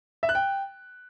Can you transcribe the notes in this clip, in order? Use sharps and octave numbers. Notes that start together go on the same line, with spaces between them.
E5
F#6
G5